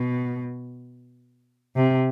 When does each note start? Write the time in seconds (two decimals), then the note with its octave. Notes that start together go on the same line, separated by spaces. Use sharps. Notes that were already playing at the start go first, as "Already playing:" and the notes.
Already playing: B2
1.76 C3